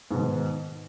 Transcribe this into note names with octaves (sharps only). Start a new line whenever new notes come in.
G#2 B2 D#3